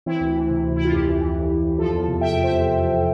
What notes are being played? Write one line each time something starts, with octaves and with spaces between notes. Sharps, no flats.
E3 C4 E4
D2
E3
C3
D2
D2 E4
F4
F2 E4 G4
E3
E3
F2
F2
F2
F3 F4 A4
E2
C3
E2 E5 G5
E2
C5 E5
C3